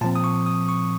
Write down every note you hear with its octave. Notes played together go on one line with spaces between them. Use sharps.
A#2 F3 C4 A5
D#6
C#6
D#6
C#6